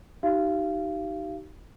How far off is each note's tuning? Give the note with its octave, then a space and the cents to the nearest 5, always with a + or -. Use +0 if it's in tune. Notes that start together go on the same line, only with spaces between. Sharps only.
D#4 +0 G4 -40 F5 -30